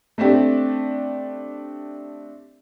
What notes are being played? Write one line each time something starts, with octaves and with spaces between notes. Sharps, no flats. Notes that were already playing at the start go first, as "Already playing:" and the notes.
A3 C4 D4 G4